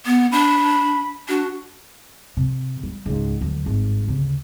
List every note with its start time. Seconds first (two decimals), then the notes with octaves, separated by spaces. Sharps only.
0.06 B3
0.32 D4 B5
1.29 D4 F#4
2.37 C3
2.83 G3
3.06 C#2 G#2
3.41 D2 F#3
3.66 G#1 G2
4.08 D2 C#3